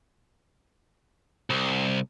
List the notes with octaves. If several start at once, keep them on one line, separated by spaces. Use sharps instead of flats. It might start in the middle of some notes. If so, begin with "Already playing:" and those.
C2